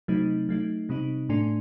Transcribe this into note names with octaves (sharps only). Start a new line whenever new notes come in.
C3 F#3 A3 C4 D#4
F#3 A3 D#4
C3 G3 C4 D#4
A2 A3 D4